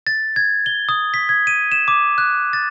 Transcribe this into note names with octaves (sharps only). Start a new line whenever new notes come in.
A6
G#6
G7
D#6
B6
G#6
D#7
E7
D6
F#6
A6